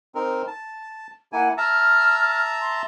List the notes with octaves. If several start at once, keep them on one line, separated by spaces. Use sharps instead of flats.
C4 D#4 A#4
A5
A#3 E4 F#5 G#5
E5 A5 A#5 F6
C6